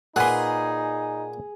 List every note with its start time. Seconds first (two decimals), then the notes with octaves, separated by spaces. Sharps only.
0.16 A#2 D#4 G#4 B4 F#5 C6